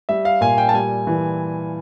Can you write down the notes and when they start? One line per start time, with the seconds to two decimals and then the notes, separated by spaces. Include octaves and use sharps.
0.09 G3 E5
0.25 F5
0.41 A#2 G#5
0.58 G5
0.69 A5
0.74 G3 G#5
1.07 E3